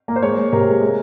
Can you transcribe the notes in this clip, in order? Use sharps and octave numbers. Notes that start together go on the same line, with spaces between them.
A#3
C5
G#3 C#5
G#3
C3 A#4
G#3
G#3